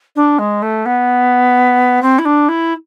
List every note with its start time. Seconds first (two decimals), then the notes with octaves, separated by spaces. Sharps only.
0.16 D4
0.39 G#3
0.62 A3
0.86 B3
2.02 C4
2.19 E4
2.25 D4
2.49 E4